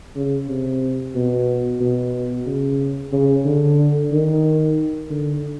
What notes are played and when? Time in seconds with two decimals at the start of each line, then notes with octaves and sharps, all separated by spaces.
0.15 C#3
0.49 C3
1.15 B2
1.80 B2
2.46 C#3
3.12 C#3
3.45 D3
4.12 D#3
5.10 D3